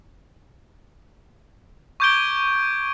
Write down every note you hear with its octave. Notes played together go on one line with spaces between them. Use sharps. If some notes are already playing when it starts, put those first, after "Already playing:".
C#6 D6 G6 G#6 D7 G7